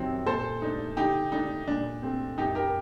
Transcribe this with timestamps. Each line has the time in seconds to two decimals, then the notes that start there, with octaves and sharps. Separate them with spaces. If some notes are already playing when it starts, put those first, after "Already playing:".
Already playing: F#2 D#3 F#3 C4
0.26 A#2 A4 C5
0.61 A3 D4 D#4
0.97 D3 D#4 G4
1.32 A3 D4 D#4
1.68 A#2 D4
2.03 A3 C4
2.38 F#2 D#4 G4
2.55 G4 A#4